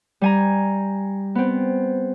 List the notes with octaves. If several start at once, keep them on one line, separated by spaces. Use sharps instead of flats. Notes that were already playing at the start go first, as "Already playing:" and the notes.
G3 G#5 A#5
B3 C4